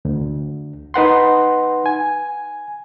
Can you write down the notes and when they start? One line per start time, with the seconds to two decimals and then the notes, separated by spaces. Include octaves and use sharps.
0.05 D2
0.94 D#4 B4 F#5 C6
1.86 G#5